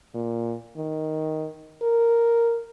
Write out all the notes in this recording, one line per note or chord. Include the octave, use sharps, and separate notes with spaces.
A#2
D#3
A#4